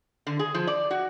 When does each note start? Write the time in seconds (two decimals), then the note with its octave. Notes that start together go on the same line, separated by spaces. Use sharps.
0.27 D3
0.39 G#4
0.54 F3
0.67 D5
0.91 F#4